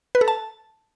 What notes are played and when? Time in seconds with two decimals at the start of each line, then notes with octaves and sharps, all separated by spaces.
0.15 B4
0.21 A4
0.28 A5